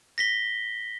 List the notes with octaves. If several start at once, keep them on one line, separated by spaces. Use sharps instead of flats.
A#6 B6 G7